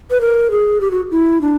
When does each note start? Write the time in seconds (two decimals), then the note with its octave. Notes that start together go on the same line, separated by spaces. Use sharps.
0.11 B4
0.21 A#4
0.51 G#4
0.81 G4
0.91 F#4
1.11 E4
1.41 D4